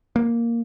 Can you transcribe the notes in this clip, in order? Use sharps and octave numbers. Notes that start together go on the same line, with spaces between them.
A#3